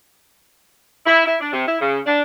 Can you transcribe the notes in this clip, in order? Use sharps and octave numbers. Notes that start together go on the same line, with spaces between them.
E4
E4
D4
C3
E4
C#3
D4